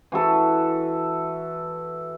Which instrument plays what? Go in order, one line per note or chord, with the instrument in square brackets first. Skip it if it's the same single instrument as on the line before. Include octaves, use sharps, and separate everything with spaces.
[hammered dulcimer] E3 F#4 A4 B4